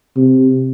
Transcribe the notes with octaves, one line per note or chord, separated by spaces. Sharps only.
C3